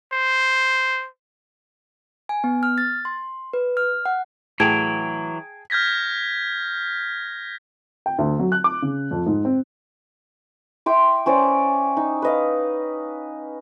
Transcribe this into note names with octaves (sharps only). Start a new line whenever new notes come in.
C5
G#5
B3
F6
A6
C6
B4
F6
F#5
A2 E3 F#3 G#4 G5 A5 G#6 D7
F6 G6 G#6 A#6 B6
G5
D2
F#3
F#6
D6
C#3
F2
G#2
C4
E5 G5 C6 D6
C#4 C5 D5 D6
D#4
B4 D#5 F5